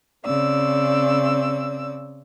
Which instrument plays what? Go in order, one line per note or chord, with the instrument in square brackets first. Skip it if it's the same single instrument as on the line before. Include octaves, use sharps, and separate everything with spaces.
[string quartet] C#3 C4 D5 E6